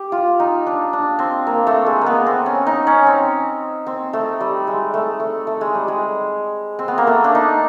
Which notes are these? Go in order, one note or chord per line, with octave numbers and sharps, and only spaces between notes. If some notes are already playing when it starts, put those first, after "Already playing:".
Already playing: G4
F4
D#4
D4
D4
C4
A#3
A3
G#3
A#3 B3
C4
C#4
D#4
C#4
C4
C4
A3
G3
G#3
A3
A3
A3
G#3
G3
G#3
C4
B3
A#3
A3
D4
D#4